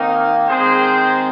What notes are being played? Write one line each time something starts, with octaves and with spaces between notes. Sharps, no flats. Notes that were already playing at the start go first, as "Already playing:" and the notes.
Already playing: D#3 A#3 C4 D#4
D#3 G#3 C4 G#4 C5